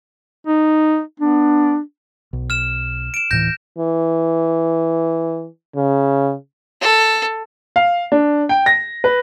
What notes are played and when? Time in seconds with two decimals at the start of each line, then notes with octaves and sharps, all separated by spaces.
0.47 D#4
1.20 B3 D4
2.33 B1
2.50 F6 E7
3.14 D7 E7
3.31 D1 A2 E3 G6 A#6
3.78 E3
5.76 C#3
6.82 A4
7.76 F5
8.12 D4
8.49 G5
8.66 A#6
9.04 B4